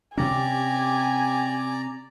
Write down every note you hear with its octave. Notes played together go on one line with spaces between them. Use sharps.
C3 C#4 G4 D5 G#5 A#5